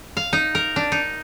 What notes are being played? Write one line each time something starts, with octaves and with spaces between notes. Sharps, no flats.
F5
D#4
A#4
D4
D#4